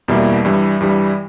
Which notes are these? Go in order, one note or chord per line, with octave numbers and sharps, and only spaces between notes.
E2 B2 G3 A#3 E4
G2 E3 G3
G2 E3 G3